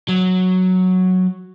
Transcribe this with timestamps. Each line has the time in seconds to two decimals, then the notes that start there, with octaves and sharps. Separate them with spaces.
0.09 F#3